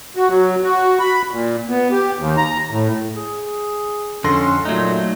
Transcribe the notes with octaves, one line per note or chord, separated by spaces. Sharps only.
F#4
F#3
F#4
B5
A#2
B3
G4
D#2
A#5
A2
G#4
F2 D3 C#4 A4 C6 A#6
A#2 F#3 A3 D#4